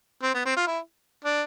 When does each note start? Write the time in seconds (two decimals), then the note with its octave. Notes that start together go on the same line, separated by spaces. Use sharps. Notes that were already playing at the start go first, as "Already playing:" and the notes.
0.22 C4
0.34 B3
0.45 C4
0.57 F4
0.67 E4
1.25 D4